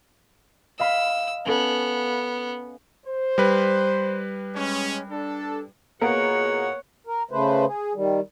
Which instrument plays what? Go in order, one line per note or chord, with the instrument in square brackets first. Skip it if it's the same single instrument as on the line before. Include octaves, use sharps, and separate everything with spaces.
[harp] D#5 F5 B5 [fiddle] E6
[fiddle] B3 [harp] C#4 A4
[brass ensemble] C5
[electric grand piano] G3 B4
[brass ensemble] G#3 C#4
D4 A4
[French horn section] B2 F4 G#4 [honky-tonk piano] A#3 B3 A#4 [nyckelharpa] C#5 F#5
[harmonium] A#4
C#3 A3 B4 C5
G#4
D#3 G3